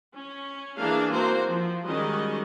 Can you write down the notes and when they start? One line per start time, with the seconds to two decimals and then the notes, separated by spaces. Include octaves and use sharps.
0.15 C#4
0.78 E3 A#3 D4 G#4 F5
1.13 A#3 C4 F#4 C5
1.47 F3
1.85 D#3 G3 G#3 C#4 F#4 D#5